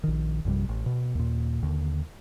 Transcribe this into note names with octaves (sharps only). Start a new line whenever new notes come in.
A#1 D#3
A#1 F#2 C3 G3
A1
B2
D#2 A#2
D#2 D3